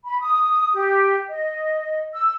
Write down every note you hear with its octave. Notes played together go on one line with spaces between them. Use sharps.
B5
D#6
G4
D#5
E6